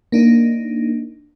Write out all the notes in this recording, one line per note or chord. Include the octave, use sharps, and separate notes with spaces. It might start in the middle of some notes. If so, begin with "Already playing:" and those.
A#3 D4 D#4